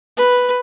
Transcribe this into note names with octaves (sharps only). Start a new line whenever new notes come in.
B4